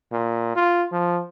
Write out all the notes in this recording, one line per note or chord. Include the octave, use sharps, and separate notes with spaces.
A#2
F4
F3